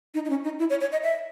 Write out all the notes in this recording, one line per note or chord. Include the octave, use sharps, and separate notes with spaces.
D#4
D#4
C#4
D#4
E4
C#5
C#5
D#5
E5